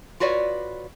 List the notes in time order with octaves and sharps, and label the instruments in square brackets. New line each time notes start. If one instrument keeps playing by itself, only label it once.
[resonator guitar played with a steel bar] F4 F#4 B4 C#5 D5